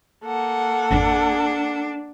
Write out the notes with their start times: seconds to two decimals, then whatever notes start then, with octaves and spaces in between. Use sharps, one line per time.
0.25 A#3 A4 F#5
0.91 G#1 F2 D4